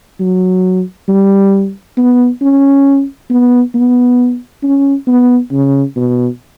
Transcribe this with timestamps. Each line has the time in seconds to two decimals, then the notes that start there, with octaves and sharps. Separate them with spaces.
0.20 F#3
1.09 G3
1.97 B3
2.42 C#4
3.30 B3
3.75 B3
4.63 C#4
5.08 B3
5.52 C#3
5.96 B2